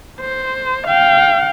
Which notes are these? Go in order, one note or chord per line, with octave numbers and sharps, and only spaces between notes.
C5
F5 G5